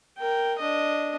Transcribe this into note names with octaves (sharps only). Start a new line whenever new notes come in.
A#4 G5
D4 D#5